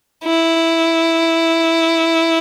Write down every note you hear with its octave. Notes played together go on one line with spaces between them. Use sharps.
E4